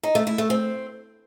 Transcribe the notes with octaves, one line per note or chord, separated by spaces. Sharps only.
D#4
A3
E4
A3
C4